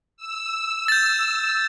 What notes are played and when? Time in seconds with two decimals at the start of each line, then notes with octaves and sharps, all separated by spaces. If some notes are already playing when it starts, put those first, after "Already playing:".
0.17 E6
0.88 G6 A6